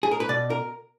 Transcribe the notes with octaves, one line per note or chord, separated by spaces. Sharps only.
G#4
A#4
B4
B2 D5
A#4